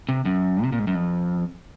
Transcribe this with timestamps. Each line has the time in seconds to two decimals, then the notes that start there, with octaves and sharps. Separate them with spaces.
0.09 C3
0.25 F#2
0.63 C3
0.72 A#2
0.79 G#2
0.87 F#2
0.95 F2